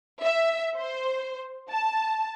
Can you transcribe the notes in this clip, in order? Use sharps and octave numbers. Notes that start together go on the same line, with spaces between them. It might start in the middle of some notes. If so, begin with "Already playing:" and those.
E5
C5
A5